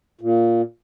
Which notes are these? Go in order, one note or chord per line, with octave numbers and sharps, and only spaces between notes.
A#2